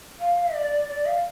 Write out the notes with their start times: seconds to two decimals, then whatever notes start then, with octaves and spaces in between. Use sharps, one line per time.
0.20 F5
0.54 D5
0.88 D5
1.06 F5